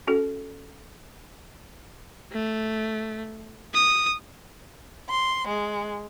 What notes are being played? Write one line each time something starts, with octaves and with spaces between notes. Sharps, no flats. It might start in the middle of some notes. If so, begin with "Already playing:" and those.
C#4 F#4 A4
A3
D#6
C6
G#3